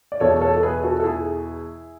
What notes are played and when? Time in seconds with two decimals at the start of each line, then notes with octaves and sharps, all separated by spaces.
0.12 D5
0.20 E2 B2 A4 C#5
0.41 A4 C#5
0.57 A4
0.63 G#4 B4
0.83 F#4 A4
1.00 A4
1.04 E4 G#4